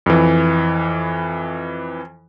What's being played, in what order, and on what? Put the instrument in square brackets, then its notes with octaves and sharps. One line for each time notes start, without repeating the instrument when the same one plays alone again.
[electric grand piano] F2 E3